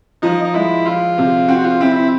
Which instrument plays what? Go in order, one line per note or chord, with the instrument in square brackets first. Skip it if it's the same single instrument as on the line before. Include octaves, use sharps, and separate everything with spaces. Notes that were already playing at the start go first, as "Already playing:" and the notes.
[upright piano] F3 [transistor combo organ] D#4
[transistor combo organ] D#4
[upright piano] G#3 [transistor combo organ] E4
[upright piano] F3 [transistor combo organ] F4
[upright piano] C3
[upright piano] C4 [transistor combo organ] F#4
[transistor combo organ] F4
[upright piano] C4 [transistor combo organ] E4
[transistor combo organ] E4